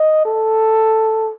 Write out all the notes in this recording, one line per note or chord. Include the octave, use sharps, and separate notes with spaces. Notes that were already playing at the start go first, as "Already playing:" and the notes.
Already playing: D#5
A4